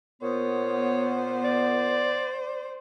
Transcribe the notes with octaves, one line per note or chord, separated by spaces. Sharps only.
A#2 B3 C5 C#5
D5